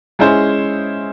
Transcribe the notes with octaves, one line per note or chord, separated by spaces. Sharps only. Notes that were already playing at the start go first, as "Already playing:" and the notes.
G#3 C#4 E4 G#4 C5